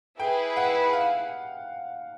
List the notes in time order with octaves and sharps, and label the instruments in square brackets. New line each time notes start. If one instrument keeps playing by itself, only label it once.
[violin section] E4 G#4 B4 [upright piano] G5
[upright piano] F#5
F5